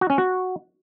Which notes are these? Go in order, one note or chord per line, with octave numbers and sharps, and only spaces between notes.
F#4
C#4
F#4